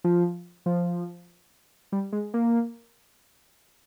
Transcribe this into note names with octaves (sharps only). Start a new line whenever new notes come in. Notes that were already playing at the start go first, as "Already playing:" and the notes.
F3
F3
G3
G#3
A#3